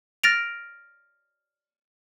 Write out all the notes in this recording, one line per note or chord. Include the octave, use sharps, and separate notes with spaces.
F6 A6 A#6 D7 F7